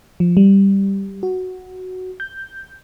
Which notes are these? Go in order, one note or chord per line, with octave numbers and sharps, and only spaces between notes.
F3
G3
F#4
G6